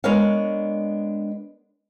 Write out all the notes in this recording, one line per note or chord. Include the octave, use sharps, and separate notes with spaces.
G#3 B3 D4 A#4 C#5 F5